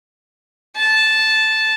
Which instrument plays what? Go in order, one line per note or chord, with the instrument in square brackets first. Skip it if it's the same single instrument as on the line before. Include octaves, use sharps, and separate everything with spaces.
[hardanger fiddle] A5